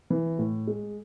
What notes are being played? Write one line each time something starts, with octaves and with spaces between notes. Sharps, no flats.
E3
A2
G#3